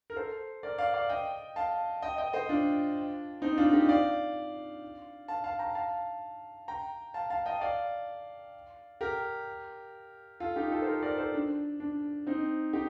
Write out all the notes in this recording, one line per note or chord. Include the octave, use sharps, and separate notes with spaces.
A#4
A4 C5
A#4 D5
D5 F5
D5 F5
D#5 G5
F5 A5
D#5 G5
D#5 G5
C5 D#5
D4 F4
C4 D#4
D4 F4
D#4 G4
D5 F5
F5 A5
F5 A5
G5 A#5
F5 A5
G5 A#5
F5 A5
F5 A5
D#5 G5
D5 F5
G4 A#4
F4 A4
D#4 G4
F4 A4
C5
G4 A#4
A#4 D5
A4 C5
D4
D4
C4 D#4
D#4 G4